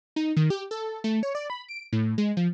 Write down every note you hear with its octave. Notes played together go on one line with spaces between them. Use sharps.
D#4
D#3
G4
A4
A3
C#5
D5
B5
D7
A2
G#3
F3